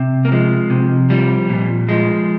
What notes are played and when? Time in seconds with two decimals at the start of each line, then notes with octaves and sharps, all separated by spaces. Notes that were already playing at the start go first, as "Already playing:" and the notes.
Already playing: C3
0.25 A#3
0.32 F3 G#3
0.70 C3
1.10 F3 G3
1.49 A#2
1.89 F3 G#3